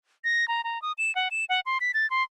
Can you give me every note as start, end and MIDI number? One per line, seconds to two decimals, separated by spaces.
0.24 0.48 94
0.48 0.64 82
0.64 0.81 82
0.82 0.92 87
0.98 1.14 100
1.15 1.28 78
1.31 1.45 100
1.49 1.60 78
1.66 1.78 84
1.81 1.92 95
1.94 2.09 93
2.10 2.23 84